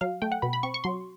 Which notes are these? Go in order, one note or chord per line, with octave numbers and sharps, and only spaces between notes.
F#3 F5
A3 G5
F#5
B2 B5
B5
C4 C#6
C#6
F#3 C6